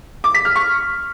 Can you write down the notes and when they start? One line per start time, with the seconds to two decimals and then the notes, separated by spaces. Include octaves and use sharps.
0.24 D6
0.34 B6
0.45 F6
0.56 C#6